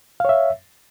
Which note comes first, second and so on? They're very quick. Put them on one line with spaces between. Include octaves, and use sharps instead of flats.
F5 C#5 E5